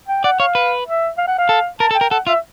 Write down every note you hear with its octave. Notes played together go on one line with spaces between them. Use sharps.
G5
D5 F#5
C#5 F5
B4
E5
F5
F#5
F5
A4
A#4 A5
A4
G5
A#4
A4 F#5
F4 E5